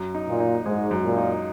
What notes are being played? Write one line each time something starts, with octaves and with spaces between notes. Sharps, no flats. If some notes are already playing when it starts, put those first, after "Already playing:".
Already playing: F#2
D#4
A#2
D#4
G#2 G#3
F#2
A#2
D#4